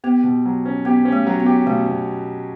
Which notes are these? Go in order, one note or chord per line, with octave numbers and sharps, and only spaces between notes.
B3 G4
B2
F#3
C#4
B3 G4
C#4
A3
F#3
B3
G4
B2 A3
B2